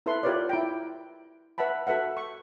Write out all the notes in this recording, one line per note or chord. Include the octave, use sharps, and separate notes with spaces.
E4 A4 B4 E5 C6
F4 G4 A#4 B4 C#5 D5
E4 G5
B4 E5 F#5 A5 B5
F#4 A4 B4 E5 F#5
C#6